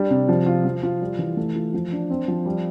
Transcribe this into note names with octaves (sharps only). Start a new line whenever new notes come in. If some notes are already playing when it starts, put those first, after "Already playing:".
Already playing: G3 D4
C3
F3
F4
F3
F4
G3
E3
A3
F4
F3
D4
C4
F3
G3